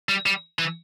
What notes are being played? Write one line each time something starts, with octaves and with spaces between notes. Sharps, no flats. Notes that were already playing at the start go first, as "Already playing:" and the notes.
G3
G3
E3